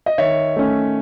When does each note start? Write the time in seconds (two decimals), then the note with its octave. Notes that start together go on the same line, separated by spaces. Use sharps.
0.06 D#5
0.18 D#3 C#5 E5
0.56 A3 C#4